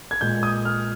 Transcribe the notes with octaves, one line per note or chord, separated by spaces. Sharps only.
G#6
A#2 G#3 G6
D#6
F6